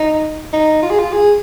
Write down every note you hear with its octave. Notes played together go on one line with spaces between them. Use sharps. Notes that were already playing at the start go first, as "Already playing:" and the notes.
Already playing: D#4
D#4
F4
G#4
F4
G#4